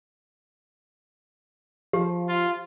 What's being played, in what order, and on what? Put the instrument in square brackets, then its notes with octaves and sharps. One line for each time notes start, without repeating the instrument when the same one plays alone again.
[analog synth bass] F3 [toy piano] G4
[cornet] F4